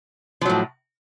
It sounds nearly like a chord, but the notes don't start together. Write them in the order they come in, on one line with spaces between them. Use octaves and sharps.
F3 F#3 A2